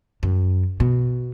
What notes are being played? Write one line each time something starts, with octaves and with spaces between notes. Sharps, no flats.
F#2
B2